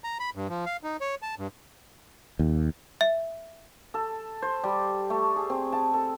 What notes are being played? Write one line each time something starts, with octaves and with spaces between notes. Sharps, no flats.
A#5
B5
G2
F3
F5
D#4
C#5
A5
G2
D#2
E5
A4
C5
G3
A3
G#4
C4
A5
A4